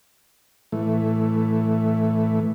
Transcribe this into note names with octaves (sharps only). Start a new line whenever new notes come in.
A2 E3 A3